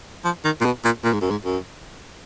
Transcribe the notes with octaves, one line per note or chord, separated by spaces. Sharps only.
F3
D#3
A#2
B2
A#2
A#2
G#2
F#2
G#2
F#2